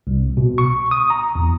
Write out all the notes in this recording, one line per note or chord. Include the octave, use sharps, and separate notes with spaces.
C2
B2
C#6
D#6
A#5
E2